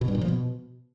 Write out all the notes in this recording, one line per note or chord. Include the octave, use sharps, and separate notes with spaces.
B2
G2
A#2
F3
B2